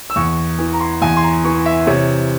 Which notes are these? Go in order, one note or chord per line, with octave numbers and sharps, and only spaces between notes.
E6
E2 C#6
E3
A#5
C6
E2 G#5
C6
A#5
E3 C#6
E5
C3 C#5